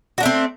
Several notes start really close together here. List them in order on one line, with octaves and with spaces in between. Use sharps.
F#4 D4 A3 C4